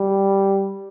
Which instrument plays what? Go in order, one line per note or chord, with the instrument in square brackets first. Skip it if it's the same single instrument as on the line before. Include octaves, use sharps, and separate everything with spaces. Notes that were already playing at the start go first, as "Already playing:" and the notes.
Already playing: [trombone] G3